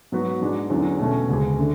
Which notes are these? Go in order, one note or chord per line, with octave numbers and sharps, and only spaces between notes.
G#2 F#3 B3 F#4 B4
G#2 G#3 D4
E2 D3 F#3 C#4 G#4
B2 A3 C#4
D2 C#3 G#3 C#4 G#4
D3 A3